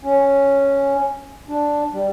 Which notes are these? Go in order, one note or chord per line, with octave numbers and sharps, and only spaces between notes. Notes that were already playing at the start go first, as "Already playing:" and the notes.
C#4
D4
G3